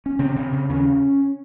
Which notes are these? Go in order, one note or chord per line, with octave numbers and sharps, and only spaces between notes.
C#4
C#3 C4
C#3
C#3
D#2 C#4